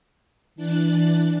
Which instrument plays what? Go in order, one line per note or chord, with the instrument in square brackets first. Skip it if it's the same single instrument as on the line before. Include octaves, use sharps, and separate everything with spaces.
[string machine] E3 D4 F#6 A6